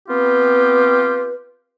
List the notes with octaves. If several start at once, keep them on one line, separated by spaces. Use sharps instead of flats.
B3 C4 F4 G4 B4